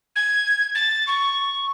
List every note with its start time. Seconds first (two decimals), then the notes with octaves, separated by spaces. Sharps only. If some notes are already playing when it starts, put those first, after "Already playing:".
0.16 G#6
0.75 A6
1.07 C#6